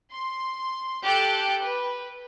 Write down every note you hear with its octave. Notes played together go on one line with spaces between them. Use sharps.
C6
G4 A4 F#6 G6 D7
B4